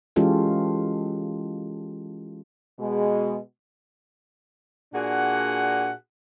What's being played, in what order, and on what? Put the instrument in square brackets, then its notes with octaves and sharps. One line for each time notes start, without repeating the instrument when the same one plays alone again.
[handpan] E3 G#3 C#4 F4 G4 A4
[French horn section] B2 G#3
[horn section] A#2 D4 F#4 G#4 F#5